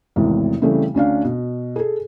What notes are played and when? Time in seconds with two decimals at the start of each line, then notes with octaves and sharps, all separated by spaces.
0.16 G#1 E2 A2 C3
0.62 C#3 E3 G3 A3 C4
0.94 D2 C#4 D4 F5
1.24 B2
1.76 G#4 A4